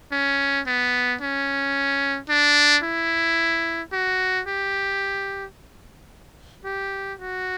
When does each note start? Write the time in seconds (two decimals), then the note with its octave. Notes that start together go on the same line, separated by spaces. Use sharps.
0.12 C#4
0.67 B3
1.21 C#4
2.29 D4
2.84 E4
3.93 F#4
4.47 G4
6.64 G4
7.19 F#4